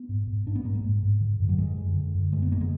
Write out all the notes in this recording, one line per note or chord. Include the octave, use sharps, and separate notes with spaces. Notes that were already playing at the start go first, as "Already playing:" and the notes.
Already playing: B3
G#2
G#2
G#2 D4
B3
G#2 A#3
G#3
G#2
G#2
D3
F#2
F#3
F#2 G#3
D3
D3
F#2
F#2 G#3
B3
D3 A#3
G#3